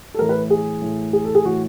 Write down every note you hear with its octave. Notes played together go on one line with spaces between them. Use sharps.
A4
A2 E3 A#4
B4
G#4
A2 E3
G#4
A4
G#4
A2 E3 F#4